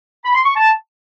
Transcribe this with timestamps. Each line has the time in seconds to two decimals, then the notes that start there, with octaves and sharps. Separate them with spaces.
0.25 B5
0.35 C6
0.45 C#6
0.55 A5